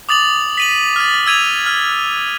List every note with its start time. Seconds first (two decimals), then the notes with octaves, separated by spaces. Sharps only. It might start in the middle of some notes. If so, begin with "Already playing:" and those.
0.09 D6 D#6 A6 F7 F#7
0.58 B6 D#7 F#7
0.96 F6 A6
1.26 E6 G#6 D#7 F7
1.66 F6